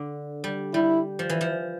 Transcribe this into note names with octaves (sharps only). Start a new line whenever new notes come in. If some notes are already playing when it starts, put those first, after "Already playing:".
Already playing: D3
G3
G3 E4
F3
E3
F3